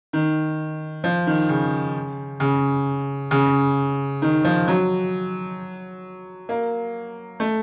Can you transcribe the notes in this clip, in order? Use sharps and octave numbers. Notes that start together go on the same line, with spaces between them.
D#3
F3
D#3
C#3
C#3
C#3
D#3
F3
F#3
A#3
A3